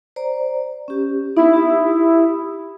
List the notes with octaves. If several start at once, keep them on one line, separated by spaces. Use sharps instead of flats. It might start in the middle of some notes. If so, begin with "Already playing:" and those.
C5 D5 A#5
C#4 G4
B3 D#4 E4
G4 D#6